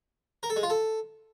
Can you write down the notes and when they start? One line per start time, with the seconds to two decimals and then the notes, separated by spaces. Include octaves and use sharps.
0.43 A#4
0.50 A4
0.56 G#3
0.63 F4
0.70 A4